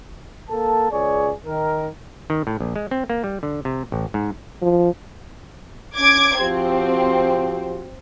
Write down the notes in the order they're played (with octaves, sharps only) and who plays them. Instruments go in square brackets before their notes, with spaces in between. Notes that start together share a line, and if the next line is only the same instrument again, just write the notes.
[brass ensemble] A#3 A4 A5
C#2 G#4 C#5 D5
D#3 A#4
[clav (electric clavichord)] D#3
A2
A#1
G#3
C4
A#3
G3
D3
C3
A1
G#2
[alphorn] F3
[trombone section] C#4 [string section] D6 G#6
[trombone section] F3 F#4 G4 [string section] C4